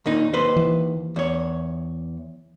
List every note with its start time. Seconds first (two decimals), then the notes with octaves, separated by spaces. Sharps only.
0.06 D#2 A#2 D#4
0.33 D#2 B4 C5
0.57 E3
1.16 E2 C#5